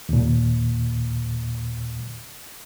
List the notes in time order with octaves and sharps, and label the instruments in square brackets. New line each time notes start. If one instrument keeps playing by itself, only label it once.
[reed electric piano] D#2 A#2